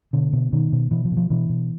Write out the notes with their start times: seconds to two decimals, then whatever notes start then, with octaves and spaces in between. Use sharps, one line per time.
0.13 B2 D3
0.33 B2
0.52 B2 D#3
0.72 B2
0.91 B2 E3
1.05 F3
1.11 B2
1.17 F3
1.30 B2 E3
1.49 B2